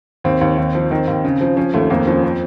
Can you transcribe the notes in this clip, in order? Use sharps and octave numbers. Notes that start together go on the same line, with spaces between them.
D#2 C4
D#2
D#2
F3
D#3 C4
D#2
C#3
F3
F3 C#4
D#2 A3
C4
F2 A#3
F3 C#4
C4